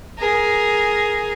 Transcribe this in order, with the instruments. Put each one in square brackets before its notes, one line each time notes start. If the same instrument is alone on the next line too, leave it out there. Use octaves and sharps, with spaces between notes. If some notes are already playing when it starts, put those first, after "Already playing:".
[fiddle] G#4 A#4